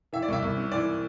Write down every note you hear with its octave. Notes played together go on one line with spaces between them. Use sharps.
E3 E5
D5
C2 E5
C2
C3
E3 D5